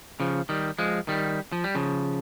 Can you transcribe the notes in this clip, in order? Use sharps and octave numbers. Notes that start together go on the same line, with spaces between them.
C#3 F3
D#3 G3
F3 G#3
D#3 G3
F3
G3
C#3 F3